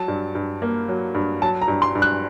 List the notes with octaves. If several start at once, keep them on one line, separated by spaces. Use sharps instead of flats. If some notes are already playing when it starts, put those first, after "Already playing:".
Already playing: F#3 A5
G2
G2
A#3
F#3
G2
F#3 A5
A#5
G2
C6
G2
F#6